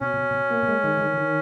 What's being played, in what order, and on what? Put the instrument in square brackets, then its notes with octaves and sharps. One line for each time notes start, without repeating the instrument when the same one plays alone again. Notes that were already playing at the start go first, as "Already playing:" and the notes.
[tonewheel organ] B2 [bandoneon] C#4
[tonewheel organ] B2
B2
A#3
G#3
D#3
D#3
D#3